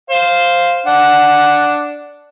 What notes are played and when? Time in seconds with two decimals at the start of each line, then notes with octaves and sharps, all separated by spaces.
0.10 C5 F5
0.87 D4 F#5